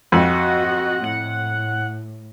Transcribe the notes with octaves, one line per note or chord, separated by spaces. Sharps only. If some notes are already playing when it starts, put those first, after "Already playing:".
F2 F#4 D#5 F#5
A2 F#5